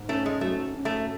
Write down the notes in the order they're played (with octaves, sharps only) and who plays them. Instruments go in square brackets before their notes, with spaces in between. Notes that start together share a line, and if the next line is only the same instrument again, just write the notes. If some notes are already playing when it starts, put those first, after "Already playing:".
Already playing: [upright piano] G#2
[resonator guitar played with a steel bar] A3 [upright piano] C#4
[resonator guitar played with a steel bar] G#3
[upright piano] F#3 [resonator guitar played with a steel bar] A3
[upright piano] C#4
[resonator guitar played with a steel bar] A3